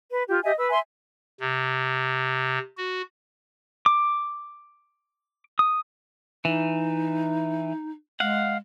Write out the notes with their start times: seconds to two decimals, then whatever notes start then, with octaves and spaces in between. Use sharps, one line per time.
0.10 B4
0.28 F4 G4
0.43 G4 D#5 E5 G#5
0.57 B4 E6
0.70 E5 G#5 C6
1.40 C3
2.77 F#4
3.86 D6
5.59 D#6
6.45 E3 D#4
8.20 G#3 F5 F#5